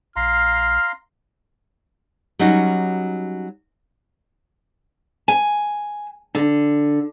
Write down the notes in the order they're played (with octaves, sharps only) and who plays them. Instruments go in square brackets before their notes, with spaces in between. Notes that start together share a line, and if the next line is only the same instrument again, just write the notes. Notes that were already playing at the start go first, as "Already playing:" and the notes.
[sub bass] A#1 [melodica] F5 A#5 C6 [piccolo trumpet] F6
[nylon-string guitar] F#3 G3 C#4 D#4 F#4
[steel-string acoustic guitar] G#5
D3